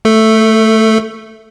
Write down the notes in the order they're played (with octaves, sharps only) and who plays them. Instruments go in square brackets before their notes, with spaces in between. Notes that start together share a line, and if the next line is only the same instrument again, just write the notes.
[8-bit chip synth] A3 A4